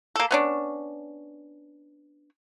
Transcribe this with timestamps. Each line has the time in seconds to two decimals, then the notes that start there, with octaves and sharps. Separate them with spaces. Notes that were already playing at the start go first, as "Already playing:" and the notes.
0.16 A#3 A4
0.31 B3 C#4 D4